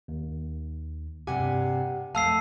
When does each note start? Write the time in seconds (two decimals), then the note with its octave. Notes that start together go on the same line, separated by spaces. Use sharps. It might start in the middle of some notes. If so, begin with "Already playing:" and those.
0.08 D#2
1.27 G2 C3 G4 F#5 G#5
2.15 F2 A3 F5 A5 E6 C7